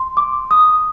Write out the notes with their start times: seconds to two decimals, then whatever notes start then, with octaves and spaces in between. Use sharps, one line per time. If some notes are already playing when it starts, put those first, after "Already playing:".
Already playing: C6
0.17 D6
0.51 D#6